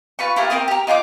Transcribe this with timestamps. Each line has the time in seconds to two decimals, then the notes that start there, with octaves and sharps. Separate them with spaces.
0.19 F4 B4 C#6
0.36 E4 F4 G4 A#4
0.50 A#3 C4 A#4 D#6
0.68 G4 A#4
0.87 D#4 F4 G5 D6